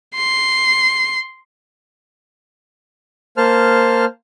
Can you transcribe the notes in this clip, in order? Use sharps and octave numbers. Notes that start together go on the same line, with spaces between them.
C6
A#3 C5 A5 F6